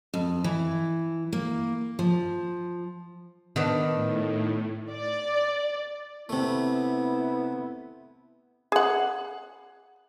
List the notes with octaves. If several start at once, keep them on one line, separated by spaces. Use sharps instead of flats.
F2
E3
A#3
F3
D#3 B3 D4
A2
D5
C3 A3 B3 E4
G#4 F#5